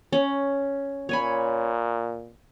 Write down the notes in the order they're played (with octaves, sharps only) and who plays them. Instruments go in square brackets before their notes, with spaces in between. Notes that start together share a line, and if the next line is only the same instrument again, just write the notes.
[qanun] C#4
[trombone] A#2 [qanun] C#5 G#5 B5